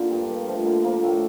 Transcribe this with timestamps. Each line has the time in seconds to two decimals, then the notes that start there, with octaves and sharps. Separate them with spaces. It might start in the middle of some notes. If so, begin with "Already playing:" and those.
Already playing: D3 A#3 D4 F4
0.11 G2 G4
0.29 G2 A#3
0.48 F3 A3
0.66 D3 A#3
0.84 F3 A#3
1.03 A2 A3